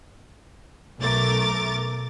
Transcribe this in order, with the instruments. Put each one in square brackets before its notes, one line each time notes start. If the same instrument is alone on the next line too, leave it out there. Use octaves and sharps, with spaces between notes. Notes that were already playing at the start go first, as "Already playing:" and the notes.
[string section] B1 A3 A#4 D6 A6